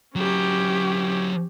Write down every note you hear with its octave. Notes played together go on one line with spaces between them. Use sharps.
F#3 C#4 E4 G4